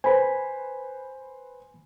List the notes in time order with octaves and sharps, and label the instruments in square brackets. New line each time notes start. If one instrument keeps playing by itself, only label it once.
[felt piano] B4 C5 [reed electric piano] G#5 B5